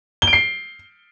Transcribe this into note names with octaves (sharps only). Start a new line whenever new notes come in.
G7
D7
C7